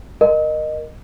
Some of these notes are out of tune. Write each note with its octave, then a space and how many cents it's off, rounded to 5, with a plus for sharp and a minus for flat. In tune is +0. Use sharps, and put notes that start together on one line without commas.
A#4 +10 D#5 -20